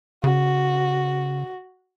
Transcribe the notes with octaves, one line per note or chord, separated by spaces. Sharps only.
C#3 F#4